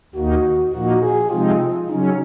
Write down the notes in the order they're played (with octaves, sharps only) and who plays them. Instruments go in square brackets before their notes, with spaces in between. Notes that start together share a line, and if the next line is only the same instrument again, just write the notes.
[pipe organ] D#2 D#3 A#3 D#4 [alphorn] F#4
[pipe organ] A#2 F3 A#3 D#4 [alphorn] F#4
[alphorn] G#4
[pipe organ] C3 F3 G#3 C4 D#4 [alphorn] F4
[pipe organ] C#3 F#3 C#4 [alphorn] D#4